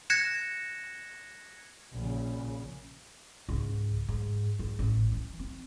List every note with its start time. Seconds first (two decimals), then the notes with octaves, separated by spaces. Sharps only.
0.10 F#6 G#6 A#6 C#7 E7
1.94 A#1 C#3
3.49 C#2 G#2
4.08 G#2
4.59 G#2
4.79 A1
5.12 E3
5.39 C4